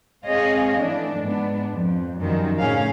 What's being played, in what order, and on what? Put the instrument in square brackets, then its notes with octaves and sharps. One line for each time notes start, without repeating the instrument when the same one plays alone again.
[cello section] G#2 C4 G#4 C#5 D#5 F5
E3 A3 D4
G#2 B3 D4
F2
F#2 D#3 F3 G3
A2 C#3 C#4 G#4 F5